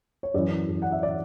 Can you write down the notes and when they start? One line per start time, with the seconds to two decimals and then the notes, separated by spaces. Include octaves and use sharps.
0.23 C#5
0.34 F#2 E3 D5
0.69 F#2 E3
0.82 F#5
0.92 E5
1.03 E3 D5